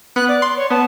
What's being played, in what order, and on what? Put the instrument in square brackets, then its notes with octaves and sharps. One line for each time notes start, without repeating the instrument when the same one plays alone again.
[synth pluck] B3 [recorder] F#6
[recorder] D5
[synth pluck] C6
[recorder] C#5
[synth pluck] B3 [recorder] A5